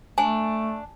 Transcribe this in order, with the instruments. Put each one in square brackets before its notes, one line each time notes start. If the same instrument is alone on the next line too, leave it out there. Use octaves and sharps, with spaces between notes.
[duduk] A3 [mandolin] D4 [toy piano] G#5